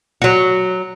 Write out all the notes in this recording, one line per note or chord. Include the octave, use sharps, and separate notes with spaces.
F#3 F#4